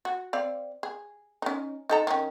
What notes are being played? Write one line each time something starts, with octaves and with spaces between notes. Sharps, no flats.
F#4
C4 D5 F5
G#4
C#4 D#4
D#4 A4 A#5
D#3 C#4